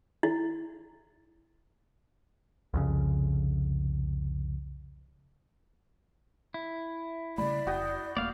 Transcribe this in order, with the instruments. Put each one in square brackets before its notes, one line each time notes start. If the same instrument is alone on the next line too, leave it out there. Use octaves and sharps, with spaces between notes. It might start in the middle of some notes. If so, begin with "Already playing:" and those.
[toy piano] E4
[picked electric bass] C2 F2 C#3
[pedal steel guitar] E4
[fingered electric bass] C#3 G3 A3 [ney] D5 [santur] B5
[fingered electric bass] F1 [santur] F#4 G5 D#6
[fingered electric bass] D#1 A3 A#3 [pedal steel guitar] D5 F5 F6